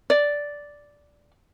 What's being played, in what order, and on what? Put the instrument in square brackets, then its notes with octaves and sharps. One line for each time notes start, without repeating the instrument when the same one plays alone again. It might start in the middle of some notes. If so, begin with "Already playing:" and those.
[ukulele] D5